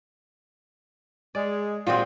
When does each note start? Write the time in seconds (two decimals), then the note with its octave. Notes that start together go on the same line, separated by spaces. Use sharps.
1.35 G#3 D5
1.87 A#2 F#3 G#3 C4 F4 G4